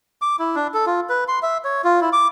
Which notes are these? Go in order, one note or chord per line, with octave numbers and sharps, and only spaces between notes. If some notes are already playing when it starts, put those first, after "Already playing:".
D6
E4
D4
A4
F4
B4
C6
E5
C#5
F4
E4
D6